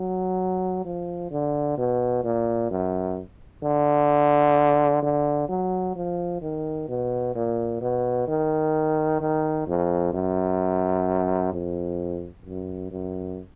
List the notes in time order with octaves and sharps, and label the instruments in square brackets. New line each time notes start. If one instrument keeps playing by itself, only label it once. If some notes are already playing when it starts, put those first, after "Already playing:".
Already playing: [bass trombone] F#3
F3
D3
B2
A#2
F#2
D3
D3
F#3
F3
D#3
B2
A#2
B2
D#3
D#3
F2
F#2
F2
F#2
F#2